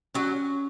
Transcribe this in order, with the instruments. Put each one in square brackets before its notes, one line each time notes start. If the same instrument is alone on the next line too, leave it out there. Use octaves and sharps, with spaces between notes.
[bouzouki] F#3 [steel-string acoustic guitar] C#4